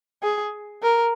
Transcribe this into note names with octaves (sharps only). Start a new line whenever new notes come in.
G#4
A#4